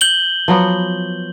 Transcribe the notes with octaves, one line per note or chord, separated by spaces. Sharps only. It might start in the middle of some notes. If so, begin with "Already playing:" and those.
G6 F#7 G7
F3 F#3 B3